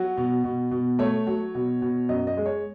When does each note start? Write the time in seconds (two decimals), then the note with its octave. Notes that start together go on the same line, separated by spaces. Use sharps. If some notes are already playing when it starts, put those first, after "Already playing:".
Already playing: F#3 F#4
0.17 B2
0.44 B2
0.71 B2
0.99 A3 C#5
1.27 F#3
1.55 B2
1.82 B2
2.09 F#2 D#5
2.27 D#5
2.37 G#3
2.46 C#5